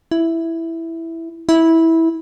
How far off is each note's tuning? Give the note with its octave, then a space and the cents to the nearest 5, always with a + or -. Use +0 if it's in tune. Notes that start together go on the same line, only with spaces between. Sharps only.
E4 +0
E4 -15